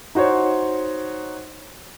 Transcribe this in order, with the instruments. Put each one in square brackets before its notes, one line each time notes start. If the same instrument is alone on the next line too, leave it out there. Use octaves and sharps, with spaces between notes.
[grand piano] D#4 F#4 C5 C#5